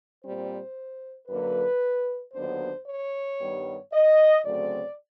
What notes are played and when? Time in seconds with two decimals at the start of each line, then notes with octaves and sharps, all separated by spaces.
0.23 A#2 G3 C4 C5
1.28 F#2 D3 F#3 A#3 B4
2.34 D#2 D3 F#3 B3 D4 C5
2.87 C#5
3.39 G2 D#3 G3 B3
3.92 D#5
4.44 D2 C#3 F#3 A3 C4 D5